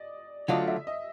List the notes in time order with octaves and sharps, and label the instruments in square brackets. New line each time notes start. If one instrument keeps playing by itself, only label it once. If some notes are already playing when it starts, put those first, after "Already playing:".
Already playing: [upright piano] D5 D#5
[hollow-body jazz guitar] D3 F#3 A3 D4 F4 [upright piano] D#5
[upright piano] E5
D#5